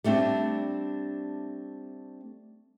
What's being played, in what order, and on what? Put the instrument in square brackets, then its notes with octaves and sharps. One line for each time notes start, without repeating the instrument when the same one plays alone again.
[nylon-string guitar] G3 A3 C4 D4